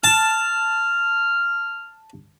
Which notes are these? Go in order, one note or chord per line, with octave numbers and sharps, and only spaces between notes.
A5 F6